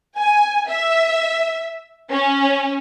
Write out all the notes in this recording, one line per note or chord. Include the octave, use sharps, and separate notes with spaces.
G#5
E5
C#4